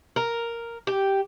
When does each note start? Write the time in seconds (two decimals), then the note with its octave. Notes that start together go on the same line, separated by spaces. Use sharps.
0.16 A#4
0.87 G4